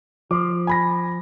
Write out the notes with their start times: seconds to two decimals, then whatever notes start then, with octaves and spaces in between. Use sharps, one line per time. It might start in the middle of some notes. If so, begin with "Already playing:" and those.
0.31 F3 D6
0.67 G#5 B5 A#6